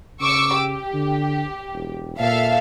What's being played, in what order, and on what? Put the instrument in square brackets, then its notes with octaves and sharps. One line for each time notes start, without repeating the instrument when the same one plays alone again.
[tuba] C#3 [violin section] C#6 D6 E6
[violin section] G4
[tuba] D3
E1
[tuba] A#2 [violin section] A4 E5 F5